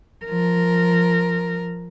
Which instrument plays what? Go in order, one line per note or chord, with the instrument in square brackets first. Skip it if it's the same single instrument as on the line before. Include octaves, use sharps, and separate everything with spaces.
[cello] F3 A#4